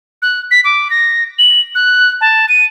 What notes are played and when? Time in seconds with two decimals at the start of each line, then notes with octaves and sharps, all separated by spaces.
0.22 F#6
0.51 B6
0.64 D6
0.90 A#6
1.39 F#7
1.75 F#6
2.21 A5
2.49 D#7